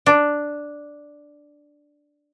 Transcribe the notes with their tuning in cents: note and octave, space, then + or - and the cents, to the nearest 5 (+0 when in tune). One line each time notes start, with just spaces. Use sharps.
D4 +0